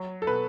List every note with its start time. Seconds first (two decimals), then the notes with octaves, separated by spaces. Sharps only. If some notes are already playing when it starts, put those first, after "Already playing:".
Already playing: F#3
0.22 A4
0.27 B2 B4